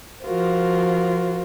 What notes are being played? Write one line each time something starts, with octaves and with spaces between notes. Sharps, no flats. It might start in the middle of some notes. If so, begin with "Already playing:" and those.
F3 F4 F#4 A#4 C5